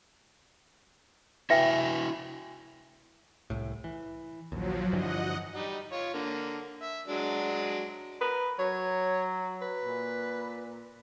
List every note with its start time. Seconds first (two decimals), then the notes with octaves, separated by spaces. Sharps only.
1.50 E4 F#4 B4 E5 G5 G#5
3.50 C2 A2
3.84 E3
4.52 A#1 D#2 F3 F#3
4.93 G2 D3 E3 D#5 F#5
5.55 G3 D#4
5.92 F4 C#5
6.14 D3 A#3
6.82 E5
7.08 F#3 G#3 D4
8.21 A#4 B4
8.59 F#3 C#5
9.62 B4
9.84 A#2